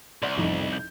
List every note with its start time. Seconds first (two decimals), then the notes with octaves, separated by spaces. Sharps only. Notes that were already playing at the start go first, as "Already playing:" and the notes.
0.22 C2 D5 F#5 C6
0.37 A1 F2 D#4
0.73 G6